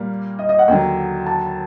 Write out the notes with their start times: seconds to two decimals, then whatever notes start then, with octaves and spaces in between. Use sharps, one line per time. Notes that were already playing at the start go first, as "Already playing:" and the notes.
Already playing: A#2 G3 A#3
0.39 D#5
0.49 D#5
0.59 F#5
0.68 D#2 D3 F#3 G5
1.26 A5